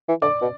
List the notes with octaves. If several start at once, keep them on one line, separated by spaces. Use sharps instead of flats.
E3
D3 D5 D6
B2